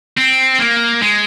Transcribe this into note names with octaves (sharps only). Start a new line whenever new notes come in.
C4
A#3
G#3